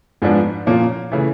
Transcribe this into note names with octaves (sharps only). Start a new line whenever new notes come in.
G#2 F3 G#3 B3 D4
A#2 F3 A#3 C#4
C#3 E3 A3